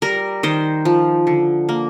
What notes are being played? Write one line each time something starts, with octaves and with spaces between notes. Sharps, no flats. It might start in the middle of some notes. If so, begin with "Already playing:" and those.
G3 A#4
D#3 C5
F3
D3
A#3